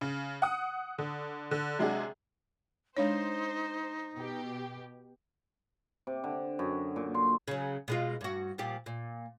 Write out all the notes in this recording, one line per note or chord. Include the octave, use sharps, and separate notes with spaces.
C#3
F#5 D#6
D3
D3
C3 F#3 G#3 D4 F#4 G#4
G#3 D4 D#4 C5 C#5
B2 G4
C3
D3
F#2
A#2
C6
C#3 F#3
B2 G#3 F4
G2 F#4
A#2 F3 G4
A#2